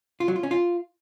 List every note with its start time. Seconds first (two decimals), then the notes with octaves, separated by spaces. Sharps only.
0.20 F4
0.28 F#3
0.36 F4
0.43 C#4
0.51 F4